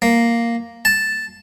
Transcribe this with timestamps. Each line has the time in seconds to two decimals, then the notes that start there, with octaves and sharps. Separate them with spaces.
0.02 A#3
0.85 A5